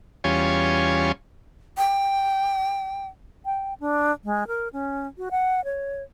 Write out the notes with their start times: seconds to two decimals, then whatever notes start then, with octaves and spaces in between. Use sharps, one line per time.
0.24 E2 G3 C#4 F4 C#5 G#5
1.77 G5
3.45 G5
3.80 D4
4.24 G#3
4.47 A#4
4.73 C#4
5.18 F#4
5.31 F#5
5.65 C#5